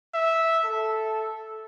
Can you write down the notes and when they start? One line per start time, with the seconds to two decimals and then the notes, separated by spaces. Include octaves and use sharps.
0.14 E5
0.65 A4